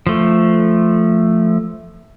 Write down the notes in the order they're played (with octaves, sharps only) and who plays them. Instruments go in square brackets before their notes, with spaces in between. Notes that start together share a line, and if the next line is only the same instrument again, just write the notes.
[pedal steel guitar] F3 A3